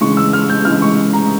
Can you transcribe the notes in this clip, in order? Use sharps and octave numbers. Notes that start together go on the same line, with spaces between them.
C#3 E3 G#3 C#6
E6
F6
G6
C#3 E3 G#3 F6
C#6
A#5